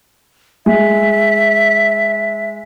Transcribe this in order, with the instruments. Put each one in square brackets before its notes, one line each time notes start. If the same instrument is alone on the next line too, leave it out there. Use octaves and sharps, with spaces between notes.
[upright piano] G#3 [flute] E5